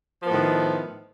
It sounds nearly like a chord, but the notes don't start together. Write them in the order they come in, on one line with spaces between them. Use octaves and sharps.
F3 B3 A2 D#3